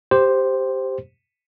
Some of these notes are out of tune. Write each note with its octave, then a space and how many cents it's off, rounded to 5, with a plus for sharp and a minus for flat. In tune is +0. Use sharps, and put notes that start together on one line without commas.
G4 +0 C5 +0